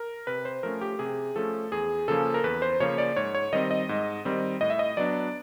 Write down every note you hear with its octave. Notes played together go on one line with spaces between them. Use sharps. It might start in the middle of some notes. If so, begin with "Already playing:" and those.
Already playing: A#4
C3 B4
C5
F3 A3 C#4 A#4
G4
C3 G#4
F3 A3 C#4 A4
E2 G#4
C#3 F3 A#3 C#4 A4
A#4
E2 B4
C5
C#3 F3 A#3 C#4 C#5
D5
G#2 C#5
C#5
D#3 G3 C4 D#5
D#5
G#2
D#3 G3 C4
A2 D#5
E5
D#5
F#3 B3 D4 D5